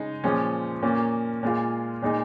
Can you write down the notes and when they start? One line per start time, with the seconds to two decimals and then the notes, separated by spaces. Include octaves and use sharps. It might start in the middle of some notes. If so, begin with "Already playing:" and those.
Already playing: C#3 G#3 D#4
0.24 A#2 F3 G#3 C#4
0.82 A#2 A#3 C#4
1.43 A#2 G#3 F4
2.02 A#2 G#3 D#4